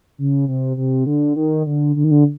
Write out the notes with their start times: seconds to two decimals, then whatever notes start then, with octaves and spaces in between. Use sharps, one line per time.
0.18 C#3
0.48 C3
0.77 C3
1.06 D3
1.36 D#3
1.66 D3
1.96 D3
2.04 D#3
2.11 D3